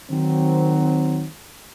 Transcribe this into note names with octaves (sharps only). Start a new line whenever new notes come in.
D#3 F#3 C4